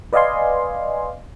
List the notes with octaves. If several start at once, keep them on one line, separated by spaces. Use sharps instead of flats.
B4 D5 D#5 F5 G#5 C6